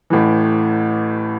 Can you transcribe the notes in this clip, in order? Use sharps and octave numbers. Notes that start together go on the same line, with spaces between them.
A1 A2 E3